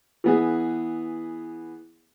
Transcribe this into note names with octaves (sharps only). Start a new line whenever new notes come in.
E3 B3 G#4